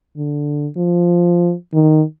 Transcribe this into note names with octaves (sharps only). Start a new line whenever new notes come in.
D3
F3
D#3